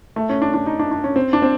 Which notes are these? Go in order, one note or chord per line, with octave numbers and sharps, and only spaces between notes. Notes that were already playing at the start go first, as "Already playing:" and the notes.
A3
C#4
D4
D4
D#4
D4
D4
C#4
C4
D4
C4